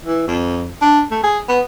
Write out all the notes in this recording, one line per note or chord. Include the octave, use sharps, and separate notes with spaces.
E3
F2
D4
A3
G#4
B3